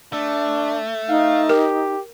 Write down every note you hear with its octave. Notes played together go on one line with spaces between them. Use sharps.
A3 D4
D#4 F5
G4 A#4